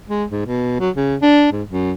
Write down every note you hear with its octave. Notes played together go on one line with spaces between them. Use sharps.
G#3
G#2
B2
F#3
C#3
D4
G#2
F#2